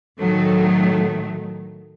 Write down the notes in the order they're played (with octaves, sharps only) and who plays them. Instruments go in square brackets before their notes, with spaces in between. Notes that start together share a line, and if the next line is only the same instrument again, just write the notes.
[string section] A2 D#3 F#3 A3